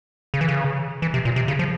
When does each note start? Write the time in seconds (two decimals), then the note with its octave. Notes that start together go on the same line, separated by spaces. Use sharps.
0.34 C#3
0.41 E3
0.48 C#3
1.02 E3
1.14 C3
1.25 A#2
1.36 C3
1.48 C#3
1.59 F3